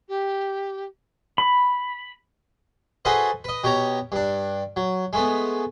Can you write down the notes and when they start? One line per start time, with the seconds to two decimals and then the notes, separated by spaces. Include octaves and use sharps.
0.08 G4
1.38 B5
3.05 F#4 G#4 A4 B4 C5 D#5
3.44 B4 D#5
3.64 B2 G4 C#5 A#5
4.12 G2 D4
4.76 F#3
5.13 G#3 A3 B3